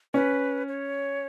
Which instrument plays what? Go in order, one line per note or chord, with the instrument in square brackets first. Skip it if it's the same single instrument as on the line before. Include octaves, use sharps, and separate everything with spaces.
[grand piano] C#4 [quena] B4
[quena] C#5